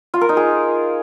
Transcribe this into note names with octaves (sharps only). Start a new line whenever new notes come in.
F4
A#4
D#4
G#4